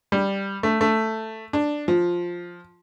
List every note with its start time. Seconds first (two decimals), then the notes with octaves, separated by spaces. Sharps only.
0.12 G3
0.63 A3
0.81 A3
1.53 D4
1.88 F3